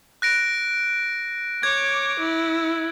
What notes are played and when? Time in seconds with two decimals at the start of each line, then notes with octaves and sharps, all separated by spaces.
0.22 F#6 A#6 D7
1.63 C#5 D6 G#6
2.20 E4